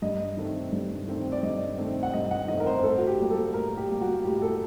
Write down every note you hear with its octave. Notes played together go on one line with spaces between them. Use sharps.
G2 D#5
D#3 A3 C4
G2
D#3 A3 C4
D5
G2 D#5
D#3 A3 C4
F#5
G2 D#5
F#5
D#3 A3 C4 D#5
A#4
C5
A2 A4
F#4
G4
G3 A#3
A4
A2 A#4
G4
G3 A#3
F#4
A2 G4
A4